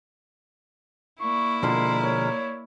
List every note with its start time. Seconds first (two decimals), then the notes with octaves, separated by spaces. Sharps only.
1.20 A#3 E4 D5 C#6
1.63 B2 D3 F3 G#3 A#4 C6
2.03 C#5